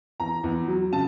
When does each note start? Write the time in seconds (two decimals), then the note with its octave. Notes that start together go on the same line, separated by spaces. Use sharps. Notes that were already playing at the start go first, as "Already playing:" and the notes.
0.20 E2 A#5
0.44 E2
0.68 F#3
0.93 C#3 A5